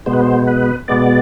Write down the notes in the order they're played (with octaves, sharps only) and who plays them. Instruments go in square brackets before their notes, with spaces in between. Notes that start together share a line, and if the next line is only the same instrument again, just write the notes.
[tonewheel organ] B2 G#3 B3 C5
B4
C5
B4
B2 G#3 B3 D5